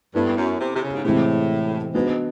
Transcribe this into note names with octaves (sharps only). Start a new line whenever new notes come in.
G2 B3 E4 A4
F#2
C3
C3
C#3
G#2
A2 C3 E3 G#3 C4
G#2 B3 D4 F#4 B4 D#5